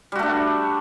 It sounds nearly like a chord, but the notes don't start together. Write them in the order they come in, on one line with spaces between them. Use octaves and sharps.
G3 F#4 A3 D4